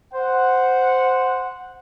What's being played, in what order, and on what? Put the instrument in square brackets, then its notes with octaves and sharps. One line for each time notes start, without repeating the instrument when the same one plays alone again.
[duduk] C5 [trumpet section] F#5